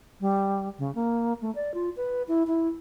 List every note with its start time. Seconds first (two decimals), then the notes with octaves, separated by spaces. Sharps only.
0.20 G3
0.79 C#3
0.95 A#3
1.41 A3
1.55 D5
1.74 F4
1.97 B4
2.28 E4
2.47 E4